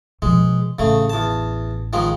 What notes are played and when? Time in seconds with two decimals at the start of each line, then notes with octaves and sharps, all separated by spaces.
0.22 B2 F3 G#3
0.79 A1 C#3 A3
1.10 E2 A5
1.93 D#3 F3 G#3